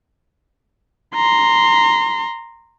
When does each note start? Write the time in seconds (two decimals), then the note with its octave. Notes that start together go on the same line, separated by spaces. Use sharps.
1.15 A#5 C6